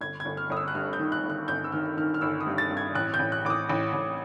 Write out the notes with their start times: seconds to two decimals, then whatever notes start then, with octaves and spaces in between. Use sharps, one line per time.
0.01 G1 G#6
0.20 G#6
0.25 G1
0.37 F6
0.50 G1 D#6
0.57 E6
0.68 F#6
0.75 G2 F6
0.93 G6
0.99 D#3
1.12 F#6
1.24 G1
1.30 F#6
1.48 G1 G6
1.64 E6
1.72 D#3 F6
1.97 D#3 F6
2.14 F6
2.21 G1 E6
2.40 D#6
2.47 G2
2.58 A6
2.70 G2
2.77 G#6
2.95 A1 F#6
3.14 G6
3.19 A1
3.32 F#6
3.45 A1 D6
3.50 D#6
3.69 A1
3.93 A1